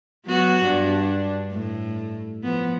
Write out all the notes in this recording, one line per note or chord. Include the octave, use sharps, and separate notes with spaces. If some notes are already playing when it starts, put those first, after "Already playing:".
F#3 B3 F#4
G2 D4
A2
F3 B3